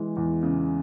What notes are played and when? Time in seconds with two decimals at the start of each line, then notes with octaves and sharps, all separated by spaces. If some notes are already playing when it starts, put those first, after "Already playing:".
Already playing: E3 G#3
0.17 E2
0.43 C#3